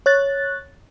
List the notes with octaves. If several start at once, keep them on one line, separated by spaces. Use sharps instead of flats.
C#5 F#6 A6